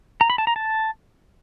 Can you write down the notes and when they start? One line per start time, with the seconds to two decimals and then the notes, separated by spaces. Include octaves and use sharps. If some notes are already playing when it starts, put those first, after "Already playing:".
0.21 A#5
0.30 B5
0.38 A5
0.47 A#5
0.56 A5